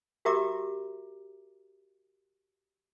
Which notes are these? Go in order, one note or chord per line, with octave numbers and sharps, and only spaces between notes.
F#4 G4 A#4 E5 A#5 D6